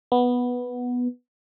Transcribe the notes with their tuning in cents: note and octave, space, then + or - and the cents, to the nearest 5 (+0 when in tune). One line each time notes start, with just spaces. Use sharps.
B3 -5